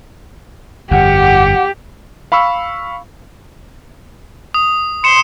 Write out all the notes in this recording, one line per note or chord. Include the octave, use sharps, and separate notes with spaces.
G1 F2 G4 F#5
F5 B5 C#6 E6
D#6
C6 C#7 E7